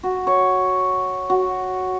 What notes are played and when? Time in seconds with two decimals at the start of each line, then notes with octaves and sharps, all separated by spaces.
0.03 F#4
0.27 C#5
1.30 F#4